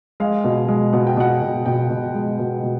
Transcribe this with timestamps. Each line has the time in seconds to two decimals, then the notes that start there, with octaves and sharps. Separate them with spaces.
0.20 G#3 F5
0.44 B2
0.68 G#3
0.93 B2 F#5
1.07 G5
1.17 B2 F#5
1.42 B2
1.66 B2 G5
1.90 B2
2.14 G#3
2.39 B2
2.63 B2